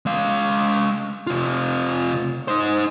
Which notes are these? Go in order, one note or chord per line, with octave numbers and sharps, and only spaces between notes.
G#3 F5
C3 F4
D#4 C5